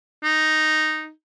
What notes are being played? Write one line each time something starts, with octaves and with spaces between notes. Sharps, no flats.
D#4